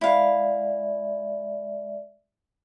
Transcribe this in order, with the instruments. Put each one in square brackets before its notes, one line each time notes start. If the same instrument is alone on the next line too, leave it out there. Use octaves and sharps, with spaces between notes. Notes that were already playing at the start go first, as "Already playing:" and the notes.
[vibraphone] G#3 D5 E5 [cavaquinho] E4 F5